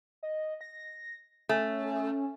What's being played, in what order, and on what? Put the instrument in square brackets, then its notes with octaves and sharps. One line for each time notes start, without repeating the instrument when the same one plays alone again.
[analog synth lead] D#5
A#6
[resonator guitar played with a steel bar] A3 [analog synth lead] C#4